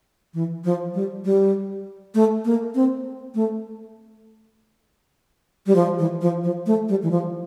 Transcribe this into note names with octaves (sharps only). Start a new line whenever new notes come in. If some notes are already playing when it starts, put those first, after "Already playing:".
E3
F3
G3
G3
A3
A#3
C4
A3
G3
F3
E3
F3
F3
A3
G3
E3
F3